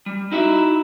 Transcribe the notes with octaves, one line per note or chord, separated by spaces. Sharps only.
G3
D#4 E4 F#4 E5